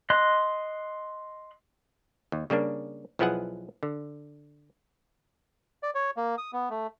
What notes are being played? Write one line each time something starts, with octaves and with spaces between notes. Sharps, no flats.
D#5 C6 F#6
D#2
C#3 G3 A#3 D4
B1 F3 B3 E4 G#4 F#5
D3
D5
C#5
A#3
D#6
B3
A3